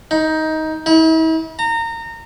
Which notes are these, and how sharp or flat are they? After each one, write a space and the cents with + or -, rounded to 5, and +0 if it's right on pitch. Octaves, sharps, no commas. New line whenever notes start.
D#4 +15
E4 -45
A#5 -25